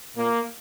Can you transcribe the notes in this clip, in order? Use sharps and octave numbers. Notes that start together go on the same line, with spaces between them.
A#2 A#3